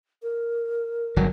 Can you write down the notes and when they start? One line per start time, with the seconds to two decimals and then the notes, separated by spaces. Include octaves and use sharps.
0.23 A#4
1.16 G1 F#3